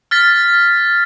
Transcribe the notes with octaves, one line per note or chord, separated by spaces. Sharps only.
F6 A6 B6